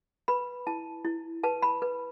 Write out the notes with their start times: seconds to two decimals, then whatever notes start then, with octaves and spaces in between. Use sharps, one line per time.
0.28 B4 B5
0.67 E4 A5
1.05 E4
1.43 B4 A5
1.62 B5
1.82 B4